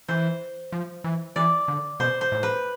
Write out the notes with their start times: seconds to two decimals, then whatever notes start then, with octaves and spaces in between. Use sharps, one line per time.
0.08 E3 C5
0.72 F3
1.04 E3
1.36 E3 D5
1.68 D3
2.00 B2 C5
2.21 C5
2.32 A2
2.43 B4